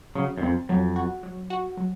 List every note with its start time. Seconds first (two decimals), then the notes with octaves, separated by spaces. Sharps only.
0.15 C#3 F#3
0.38 F#2
0.42 F2 C4
0.69 F2 F#3
0.96 F#4
1.23 F#3
1.50 F#4
1.77 F#3